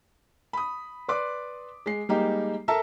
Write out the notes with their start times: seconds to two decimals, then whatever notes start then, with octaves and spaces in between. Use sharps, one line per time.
0.53 B5 D#6
1.08 B4 D5 C6 D6
1.86 G#3 C7
2.09 G3 G#3 A#3 D#4 G4
2.68 A4 A#4 E5 A5 A#5